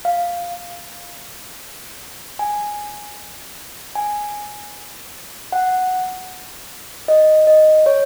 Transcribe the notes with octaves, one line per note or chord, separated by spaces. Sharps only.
F5
G#5
G#5
F#5
D#5
D#5
C#5